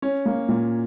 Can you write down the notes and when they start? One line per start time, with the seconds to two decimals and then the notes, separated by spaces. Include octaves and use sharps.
0.02 C#4
0.26 A#3
0.49 A#2